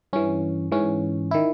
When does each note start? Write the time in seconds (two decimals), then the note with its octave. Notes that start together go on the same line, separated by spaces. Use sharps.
0.13 G2 E3 C#4
0.72 G#2 E3 C#4
1.31 D#3 E4